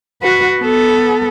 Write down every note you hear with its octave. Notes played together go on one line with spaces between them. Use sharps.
F#4 B4
B3 A4